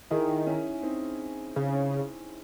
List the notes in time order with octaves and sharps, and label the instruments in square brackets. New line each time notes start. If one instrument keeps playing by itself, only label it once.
[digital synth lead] D#3 [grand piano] E4 G#4
[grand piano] D#4
C#4 E4
C4 D#4
[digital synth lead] C#3